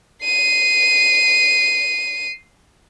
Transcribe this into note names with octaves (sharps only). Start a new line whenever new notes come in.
C7 D#7